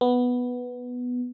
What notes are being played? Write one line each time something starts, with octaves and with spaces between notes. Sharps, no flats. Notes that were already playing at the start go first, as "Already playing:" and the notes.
B3